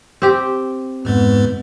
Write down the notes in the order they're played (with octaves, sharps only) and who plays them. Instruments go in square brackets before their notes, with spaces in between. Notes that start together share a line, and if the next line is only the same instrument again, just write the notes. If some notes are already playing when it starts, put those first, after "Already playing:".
[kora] C4 G4
[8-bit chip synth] F2 G#2 G#3 [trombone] B3